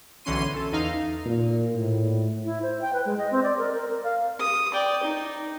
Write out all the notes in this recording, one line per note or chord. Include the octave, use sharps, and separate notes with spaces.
B1 D3 E3 C#4 C6 D#7
A4
E2 D#4 F5
A#2
A2
E4
C5
G5
B4
G#3
D#5
C4
D5
A#4
A#4
A#4
F5
D#6
D5 G5
D#4